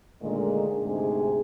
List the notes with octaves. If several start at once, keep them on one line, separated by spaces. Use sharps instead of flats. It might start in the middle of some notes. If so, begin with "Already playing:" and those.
A#2 D3 D#3 G#3 A3
D2 G#2 C3 G#4